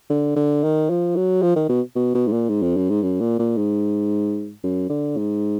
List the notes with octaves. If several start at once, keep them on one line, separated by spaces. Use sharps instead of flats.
D3
D3
D#3
F3
F#3
F3
D#3
B2
B2
B2
G#2
A#2
G#2
F2
F#2
G#2
F#2
A#2
A#2
G#2
F#2
D3
G#2